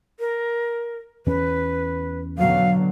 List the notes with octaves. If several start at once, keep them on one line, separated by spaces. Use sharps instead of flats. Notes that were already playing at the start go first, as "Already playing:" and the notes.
A#4
E2 C#4 B4
B2 D3 F#3 F5